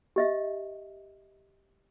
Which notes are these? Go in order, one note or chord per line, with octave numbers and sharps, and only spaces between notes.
G4 D#5 E5